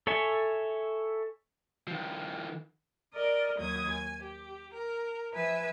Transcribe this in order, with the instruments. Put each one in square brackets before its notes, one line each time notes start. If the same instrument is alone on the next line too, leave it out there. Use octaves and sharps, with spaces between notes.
[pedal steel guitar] A4 C#5 E5 G#5
[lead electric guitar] D#3 F3
[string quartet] A#4 D5 D#5
D#2 F#3 D#6 G#6
G#5
G4
A#4
F3 B4 E5 G#5